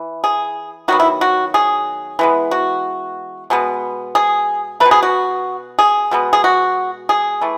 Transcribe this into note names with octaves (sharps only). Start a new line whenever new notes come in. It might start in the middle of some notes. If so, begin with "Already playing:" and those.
Already playing: E3
G#4
D#3 F#3 B3 F#4
E4
F#4
G#4
E3 G#3 B3
F#4
B2 G#3 B3
G#4
A3 B4
B2
G#4
F#4
G#4
B2 G#3 B3
G#4
F#4
G#4
E3 A3